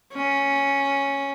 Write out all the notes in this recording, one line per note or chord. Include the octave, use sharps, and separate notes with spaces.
C#4